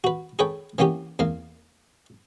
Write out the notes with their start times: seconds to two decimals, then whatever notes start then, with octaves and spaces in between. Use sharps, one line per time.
0.04 F#4 B4
0.39 G#4 A4 B4 C#5 G5
0.78 E3 A#3 B3 C#4 G4
1.19 E2 A#3 F5